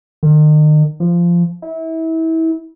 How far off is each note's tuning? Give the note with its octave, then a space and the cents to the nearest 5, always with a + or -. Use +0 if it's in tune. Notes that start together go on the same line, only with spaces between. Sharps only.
D#3 -40
F3 -15
E4 -30